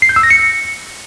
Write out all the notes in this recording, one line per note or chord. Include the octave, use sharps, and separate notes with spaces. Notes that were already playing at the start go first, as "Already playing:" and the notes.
C7
G6
E6
A#6
C#7